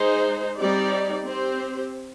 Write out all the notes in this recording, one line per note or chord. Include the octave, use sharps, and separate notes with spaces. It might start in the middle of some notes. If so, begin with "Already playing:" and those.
Already playing: G#3 D#4 G#4 C5
G3 C4 D#4 G4 D5
C4 G4 C5